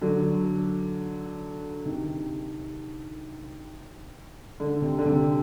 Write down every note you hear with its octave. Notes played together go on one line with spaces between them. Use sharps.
D3 F#3
C3 D#3
D3
C3
D3
C3